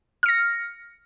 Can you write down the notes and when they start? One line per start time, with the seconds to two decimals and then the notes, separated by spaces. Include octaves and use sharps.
0.23 F6
0.26 C#7
0.29 A#6